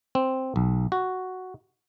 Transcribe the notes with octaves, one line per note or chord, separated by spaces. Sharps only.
C4
B1
F#4